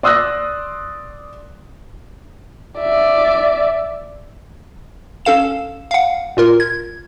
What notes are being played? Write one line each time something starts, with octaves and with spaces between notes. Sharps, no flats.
D5 C6 D#6 E6 F#6 A#6
D5 E5
C#4 A4 F5 E7
F5 F#5
A#2 F4 A#4
G#6